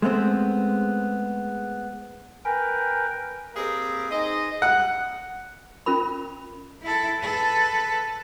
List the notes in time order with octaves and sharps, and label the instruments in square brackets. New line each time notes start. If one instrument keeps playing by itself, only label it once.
[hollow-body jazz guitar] G#3 A3 B3 C4 C5
[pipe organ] A#4 B4 G5 [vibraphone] G#5
[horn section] A#3 C4 G4 G#4 A#4 B4
D#4 G#4 C5 D#5
[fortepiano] F#5
[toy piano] C#4 F4 A#4 B5
[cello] E4 A4
A4 B4